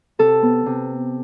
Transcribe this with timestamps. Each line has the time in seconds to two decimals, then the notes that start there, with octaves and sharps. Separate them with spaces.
0.19 C3 A4
0.42 B3
0.66 C3